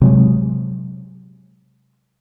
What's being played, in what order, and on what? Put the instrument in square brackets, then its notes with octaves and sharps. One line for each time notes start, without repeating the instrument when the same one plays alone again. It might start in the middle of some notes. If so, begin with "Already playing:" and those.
[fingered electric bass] C3 F#3 G#3